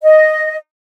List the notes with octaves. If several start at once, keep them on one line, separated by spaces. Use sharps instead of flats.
D#5